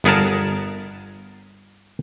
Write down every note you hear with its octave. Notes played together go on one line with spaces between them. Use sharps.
G1 B3 G#4 A#4 A5